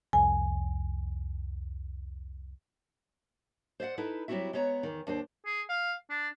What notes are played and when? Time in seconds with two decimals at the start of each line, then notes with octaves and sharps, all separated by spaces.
0.13 C2 F2 G#5
3.80 C5 D5 E5 F#5
3.98 D#4 E4 A4 B4
4.28 F#3 G3 C4 E4 F#4 E5
4.53 G#3 B3 C#5 A5 A#5
4.83 E2 D#3
5.07 D#2 D4 A4 C5
5.46 G#4
5.69 F5
6.10 D4